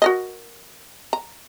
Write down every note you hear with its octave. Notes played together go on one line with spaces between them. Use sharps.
F#4 A#4 D#5
A#5